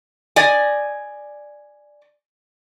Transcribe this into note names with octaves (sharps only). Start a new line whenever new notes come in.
D5 D#5 G#5